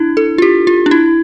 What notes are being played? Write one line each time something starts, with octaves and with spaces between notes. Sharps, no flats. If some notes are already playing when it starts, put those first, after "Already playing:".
Already playing: D4 E4
A4
F4
G4
F4
D4
E4